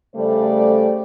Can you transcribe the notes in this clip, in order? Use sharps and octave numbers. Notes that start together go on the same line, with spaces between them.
C#3 G3 A3 A4 C5 D5